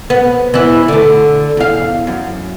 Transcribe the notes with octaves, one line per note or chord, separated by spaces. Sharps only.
B3
E3 E4
D3 A3
E2 F5
F#2